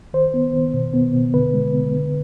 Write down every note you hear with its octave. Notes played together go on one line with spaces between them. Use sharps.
D#3 C5
B3
D#3
B2
B3
B2
D3 B4
G#3
B3
D3